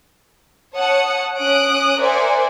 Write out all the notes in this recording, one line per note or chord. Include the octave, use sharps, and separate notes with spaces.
C#5 F#5 A5 D#6 C#7
C#4 D#6 F#6 D7
A#4 C5 D5 E5 F#5 G#5